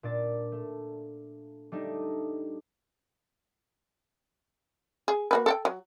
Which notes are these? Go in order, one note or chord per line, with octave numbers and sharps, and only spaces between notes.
A#2 D4 D5 A6
A3
G3 A3 D4 D#4
G#4
A#3 F#4 B4
A4 F#5 G5
F#3